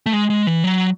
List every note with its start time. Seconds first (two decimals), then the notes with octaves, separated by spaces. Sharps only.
0.06 A3
0.13 G#3
0.30 G#3
0.47 E3
0.64 F#3